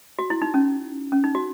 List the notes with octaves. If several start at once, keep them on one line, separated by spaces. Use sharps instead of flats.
F#4
E4
D#4
C#4
C#4
D#4
F#4